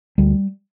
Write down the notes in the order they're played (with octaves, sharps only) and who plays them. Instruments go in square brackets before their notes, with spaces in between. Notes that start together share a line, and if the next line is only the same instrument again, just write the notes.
[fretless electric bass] D2 G3